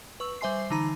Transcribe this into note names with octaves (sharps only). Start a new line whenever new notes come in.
B4 C#6 E6
G3 C5 E5 G#5 C6 C7
D3 E3 D#4 A#5 B5